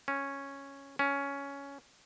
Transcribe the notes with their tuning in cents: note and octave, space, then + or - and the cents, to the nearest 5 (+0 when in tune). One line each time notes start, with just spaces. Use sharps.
C#4 -5
C#4 +10